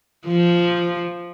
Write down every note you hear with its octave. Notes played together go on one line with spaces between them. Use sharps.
F3